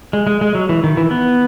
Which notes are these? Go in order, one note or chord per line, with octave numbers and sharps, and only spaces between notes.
G#3
G#3
G#3
F#3
E3
D#3
E3
B3